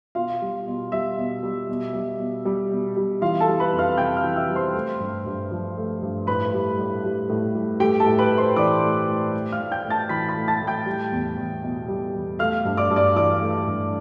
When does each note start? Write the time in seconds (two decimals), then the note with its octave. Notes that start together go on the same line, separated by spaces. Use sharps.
0.15 B2 F4 F5
0.42 G3
0.67 B2
0.92 G3 E5
1.18 B2
1.43 G3
1.69 B2
1.94 G3
2.20 B2
2.45 G3
2.71 B2
2.96 G3
3.21 E3 F4 F5
3.40 A4 A5
3.48 G3
3.60 B4 B5
3.73 F2
3.79 F5 F6
3.98 C3 G5 G6
4.17 F5 F6
4.24 E3
4.36 E5 E6
4.49 G3
4.55 C5 C6
4.74 A3
5.00 G2
5.26 G2
5.51 F3
5.77 A3
6.02 G2
6.27 A2 B4 B5
6.53 G3
6.79 A2
7.05 G3
7.29 A2
7.55 G3
7.80 A3 G4 G5
8.00 A4 A5
8.06 A2
8.19 B4 B5
8.32 A2
8.38 C5 C6
8.56 E3 D5 D6
8.83 A3
9.09 A2
9.34 A3
9.52 F5 F6
9.59 A2
9.71 G5 G6
9.85 A2
9.90 A5 A6
10.09 E3 B5 B6
10.29 B5 B6
10.36 A3
10.48 A5 A6
10.61 A2
10.67 G5 G6
10.86 G3
11.12 E2
11.38 E2
11.63 B2
11.88 G3
12.13 E2
12.39 A3 F5 F6
12.65 G2
12.77 D5 D6
12.90 G2
12.96 D5 D6
13.16 E3 D5 D6
13.41 A3
13.67 G2